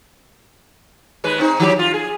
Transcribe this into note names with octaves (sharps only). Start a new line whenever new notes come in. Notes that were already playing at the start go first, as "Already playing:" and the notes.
D#2 G#3 B4
C4 D#4
D#3 F#3 G4
F4
G#4